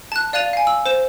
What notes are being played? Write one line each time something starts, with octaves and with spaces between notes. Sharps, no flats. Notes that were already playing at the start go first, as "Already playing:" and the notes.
A5 F#6
D5 F5 F#6 A6 D#7 F7
F5 G#5
E6
C5 E7